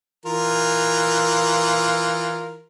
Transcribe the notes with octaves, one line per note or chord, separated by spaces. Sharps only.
E3 F4 A#4